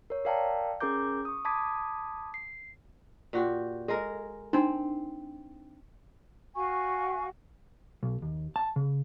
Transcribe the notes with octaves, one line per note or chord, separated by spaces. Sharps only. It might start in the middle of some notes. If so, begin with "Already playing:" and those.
A#4 C#5
A#4 D5 F5 G5 A5 A#5
C#4 G#4 A#4 A#5 D6 G6
C#6 D#6
A5 B5 D6 D#6 G#6 B6
C7
A#2 F#4 G4
G#3 A4 A#4
C4 D4 D#4
F#4 F5 G#5 C#6
B1
D#2
A5
C#3